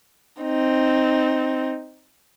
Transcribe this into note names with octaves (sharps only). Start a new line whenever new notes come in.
C4 D#4